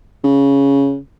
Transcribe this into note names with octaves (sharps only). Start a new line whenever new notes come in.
C#3